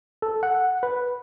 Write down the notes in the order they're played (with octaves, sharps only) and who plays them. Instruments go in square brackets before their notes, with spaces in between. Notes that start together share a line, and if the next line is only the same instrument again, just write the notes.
[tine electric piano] A4
F#5
B4